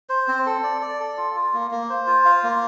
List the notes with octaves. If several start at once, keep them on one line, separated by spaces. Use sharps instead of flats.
C5
C4
A4
D5
D5
A4
F4
F4
A#3
A#3
C5
F4
F5
A#3